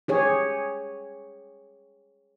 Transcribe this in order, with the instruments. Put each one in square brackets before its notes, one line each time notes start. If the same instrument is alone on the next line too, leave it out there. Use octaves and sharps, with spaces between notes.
[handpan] G4 G#4 C#5